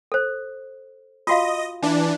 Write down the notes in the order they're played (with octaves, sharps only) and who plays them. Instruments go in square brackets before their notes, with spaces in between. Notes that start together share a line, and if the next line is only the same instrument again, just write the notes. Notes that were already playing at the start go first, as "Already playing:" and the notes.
[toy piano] A4 C5
[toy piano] F4 F#4 F5 [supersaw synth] D#5
[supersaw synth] E3 D4 [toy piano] D#4